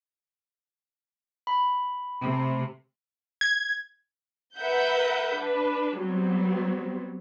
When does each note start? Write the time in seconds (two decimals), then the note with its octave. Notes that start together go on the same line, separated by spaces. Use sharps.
1.47 B5
2.22 C3 A3
3.41 G#6
4.57 A#4 B4 E5 F#5 G6
5.36 D4 B4
5.98 F#3 G3 B3 C4